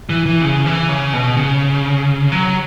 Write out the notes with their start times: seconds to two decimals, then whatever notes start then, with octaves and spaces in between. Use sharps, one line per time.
0.09 E3
0.26 E3
0.42 C#3
0.66 E3
0.89 C#3
1.13 B2
1.37 C#3
2.32 F#3